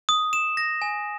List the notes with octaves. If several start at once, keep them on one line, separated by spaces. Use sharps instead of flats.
D#6
E7
A#6
G#5